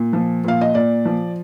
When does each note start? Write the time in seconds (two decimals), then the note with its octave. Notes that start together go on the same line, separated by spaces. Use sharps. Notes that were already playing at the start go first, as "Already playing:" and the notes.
Already playing: A#2
0.13 F3
0.44 A#2 F5
0.61 D#5
0.74 A#2 D5
1.05 F3